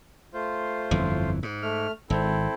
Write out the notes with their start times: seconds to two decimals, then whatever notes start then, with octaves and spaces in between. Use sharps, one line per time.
0.34 A3 F4 C5
0.91 G1 F2 E3
1.43 G#2
1.62 A3 F6
2.10 G#1 C4 E4 A4